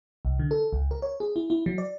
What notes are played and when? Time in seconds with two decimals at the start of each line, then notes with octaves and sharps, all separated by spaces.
0.25 C2
0.39 D3
0.51 A4
0.73 C#2
0.91 A#4
1.02 C#5
1.20 G#4
1.36 E4
1.50 E4
1.66 F#3
1.78 D5